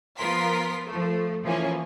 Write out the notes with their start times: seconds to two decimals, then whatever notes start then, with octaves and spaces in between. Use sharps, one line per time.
0.18 F3 B3 F4 A#4 C6 B6
0.86 F3 A3
1.43 E3 F3 A#3 C#4